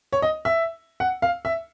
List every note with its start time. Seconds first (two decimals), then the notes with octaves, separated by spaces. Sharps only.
0.13 C#5
0.22 D#5
0.45 E5
1.00 F#5
1.22 F5
1.45 E5